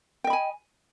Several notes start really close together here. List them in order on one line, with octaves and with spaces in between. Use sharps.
G5 D#5 B5 G#5